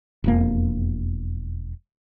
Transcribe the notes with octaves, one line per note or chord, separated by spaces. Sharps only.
E1 F2 A#3